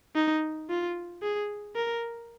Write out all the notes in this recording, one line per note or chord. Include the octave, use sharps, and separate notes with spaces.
D#4
F4
G#4
A#4